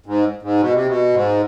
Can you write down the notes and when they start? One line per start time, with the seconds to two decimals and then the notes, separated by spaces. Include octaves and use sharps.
0.06 G#2
0.42 G#2
0.60 B2
0.73 C3
0.87 B2
1.13 G#2